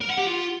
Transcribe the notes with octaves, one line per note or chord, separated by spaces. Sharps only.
A#4
F#5
G4
F4